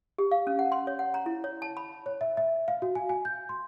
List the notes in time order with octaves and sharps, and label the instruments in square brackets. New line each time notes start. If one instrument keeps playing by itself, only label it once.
[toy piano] G4
F5
C#4
F#5
C6
C#5
F#5
A#5
E4
C#5
A5
B5
[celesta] C#5
E5
E5
F5
F#4
G#5
G#5
G6
C6